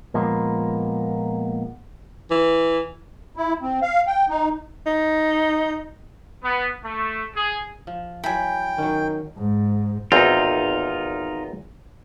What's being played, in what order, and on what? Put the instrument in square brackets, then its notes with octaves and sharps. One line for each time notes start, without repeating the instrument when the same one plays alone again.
[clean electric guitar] A#2 F3 G#3 A#3 B3
[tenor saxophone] E3
[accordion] E4
C4
F5
G5
D#4
[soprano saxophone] D#4
[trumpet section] B3
A3
G#4
[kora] F3
[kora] E3 F#3 [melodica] G5 [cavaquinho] G#5 B5
[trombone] D#3 [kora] F#3 C#4
[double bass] G#2
[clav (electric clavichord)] G#1 E2 C4 [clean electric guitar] D#4 F4